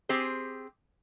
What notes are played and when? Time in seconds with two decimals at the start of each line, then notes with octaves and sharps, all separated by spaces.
0.09 C4 G4 G#4 C5